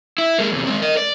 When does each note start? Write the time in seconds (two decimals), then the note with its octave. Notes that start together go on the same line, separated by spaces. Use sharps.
0.18 E4
0.38 G#3 A#3
0.52 E2 C3
0.67 G#3 C4
0.82 A#4 D#5
0.97 D5